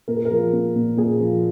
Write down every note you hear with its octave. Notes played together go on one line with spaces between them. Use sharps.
A#2 A#4
G#4
A#4
F3
A#3
A#2
A#2 G#4
F3